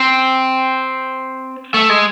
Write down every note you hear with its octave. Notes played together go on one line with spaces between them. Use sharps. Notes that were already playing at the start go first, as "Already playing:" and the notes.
Already playing: C4
A3
G#3